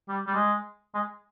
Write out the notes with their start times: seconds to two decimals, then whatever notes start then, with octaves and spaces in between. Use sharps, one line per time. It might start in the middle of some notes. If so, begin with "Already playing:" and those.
0.08 G3
0.27 G3
0.35 G#3
0.94 G#3